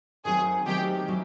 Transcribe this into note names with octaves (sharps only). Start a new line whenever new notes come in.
D#3 F#3 A3 C4 G#4
D#3 F#3 A3 C4 G4
C#3 F#3 A3